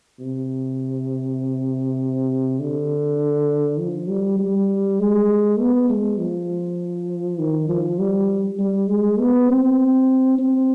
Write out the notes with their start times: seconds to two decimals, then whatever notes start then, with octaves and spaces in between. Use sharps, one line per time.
0.20 C3
2.60 D3
3.79 F3
4.09 G3
4.39 G3
5.00 G#3
5.59 B3
5.89 G#3
6.18 F3
7.39 D#3
7.69 F3
7.99 G3
8.59 G3
8.89 G#3
9.19 B3
9.48 C4
10.38 C4